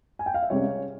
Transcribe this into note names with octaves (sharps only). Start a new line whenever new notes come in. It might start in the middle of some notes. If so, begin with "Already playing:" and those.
G#5
G5
F5
E5
C#2 C3 G3 C#5